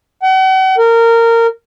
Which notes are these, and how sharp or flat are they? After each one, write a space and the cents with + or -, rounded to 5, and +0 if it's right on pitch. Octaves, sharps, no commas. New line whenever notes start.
F#5 +40
A#4 -20